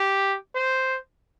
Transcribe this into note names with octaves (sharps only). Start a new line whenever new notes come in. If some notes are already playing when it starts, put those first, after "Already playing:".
Already playing: G4
C5